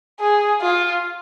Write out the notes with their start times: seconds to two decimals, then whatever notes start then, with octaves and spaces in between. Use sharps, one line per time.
0.20 G#4
0.61 F4